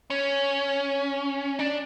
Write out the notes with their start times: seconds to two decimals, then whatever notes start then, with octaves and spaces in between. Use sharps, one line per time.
0.10 C#4
1.59 D4